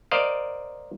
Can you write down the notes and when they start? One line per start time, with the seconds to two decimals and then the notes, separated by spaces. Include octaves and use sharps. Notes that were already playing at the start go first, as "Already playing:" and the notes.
0.11 A#4 C5 D5 D#5 F5